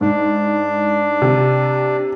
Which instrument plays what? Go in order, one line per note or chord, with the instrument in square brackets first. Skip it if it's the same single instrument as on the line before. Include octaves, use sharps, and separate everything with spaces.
[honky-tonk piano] G#2 [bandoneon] D4
[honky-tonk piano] C3